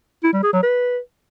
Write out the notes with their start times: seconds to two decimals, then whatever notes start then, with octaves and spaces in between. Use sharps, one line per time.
0.24 E4
0.33 G3
0.43 G#4
0.53 F#3
0.63 B4